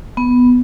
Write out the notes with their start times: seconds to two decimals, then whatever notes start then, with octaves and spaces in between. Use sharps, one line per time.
0.17 B3